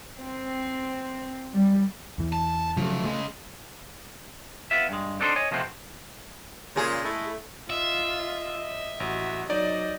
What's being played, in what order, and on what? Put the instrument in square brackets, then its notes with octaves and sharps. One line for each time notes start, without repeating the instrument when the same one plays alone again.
[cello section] C4
G3
[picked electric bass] E2 E3
[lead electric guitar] A5
[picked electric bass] C#3 F#3 [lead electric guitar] F3 A3
[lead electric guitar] C#3 G#3 [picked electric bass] A3
[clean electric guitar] B3 F4 E5
G2 G#3
C4 D4 D#4 A4 B4 C5
C#5 D#5 G#5
C3 F3 G#3 A3 C4 F#4
[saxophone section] A#2 C#3 [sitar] G#3 G#4
[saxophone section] A3 E4
[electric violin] F4 [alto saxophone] D#5 [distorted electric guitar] E5
[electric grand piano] A1 [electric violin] F#4
[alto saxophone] F#3 [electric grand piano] D#4 D5 [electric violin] D#5